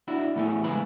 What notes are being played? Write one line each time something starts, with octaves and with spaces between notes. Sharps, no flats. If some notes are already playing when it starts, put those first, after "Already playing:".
D4 E4 F#4
A2 E3 A3 B3 G#4
C#3 G#3 B4 G#5 B5